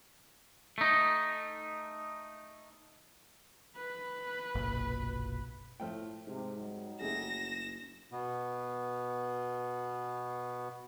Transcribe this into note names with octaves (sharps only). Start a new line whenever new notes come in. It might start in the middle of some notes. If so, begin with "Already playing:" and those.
A3 D#4
B4
F#1 B1 A#2
A2 F3 A3 G5
G#2 C3
F#3 G3 D#4
F#1 A3 G#4 A#6 E7
B2 B3